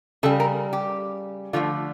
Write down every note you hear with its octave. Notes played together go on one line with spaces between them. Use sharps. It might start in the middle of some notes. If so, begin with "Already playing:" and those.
C#3 G3 A4
A#4
G4
D3 F3 A3 F4